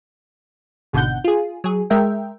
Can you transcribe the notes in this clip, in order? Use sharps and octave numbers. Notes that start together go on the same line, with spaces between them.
G#1 B2 D3 F#5 G6
F4 G#4
F#3 G#4
G#3 A#4 E5 G5